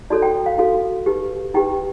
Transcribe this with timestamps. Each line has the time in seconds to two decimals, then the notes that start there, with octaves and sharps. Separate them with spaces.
0.10 D#4 F#4 A4 C#5 D5
0.22 G5
0.46 F5
0.58 D#4 F#4 A4 C#5 F5
1.06 D#4 G4 B4
1.54 D#4 G4 B4 G5